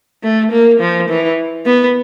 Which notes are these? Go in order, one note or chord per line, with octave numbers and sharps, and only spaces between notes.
A3
A#3
F3
E3
B3